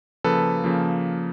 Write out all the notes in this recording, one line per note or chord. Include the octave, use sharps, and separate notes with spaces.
C#3 F3 A#3 A4 B4
C#3 F3 A#3